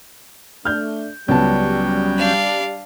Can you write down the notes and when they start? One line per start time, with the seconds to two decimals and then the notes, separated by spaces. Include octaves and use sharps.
0.65 A3 D4 F6 G6
1.28 C#2 F#3 G3 B3 C#4 G5 A5
2.18 D4 F5